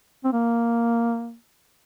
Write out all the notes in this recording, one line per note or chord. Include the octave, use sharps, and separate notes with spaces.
C4
A#3